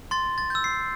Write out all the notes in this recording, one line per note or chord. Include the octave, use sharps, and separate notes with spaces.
C6 A6
A6
E6 G6
C7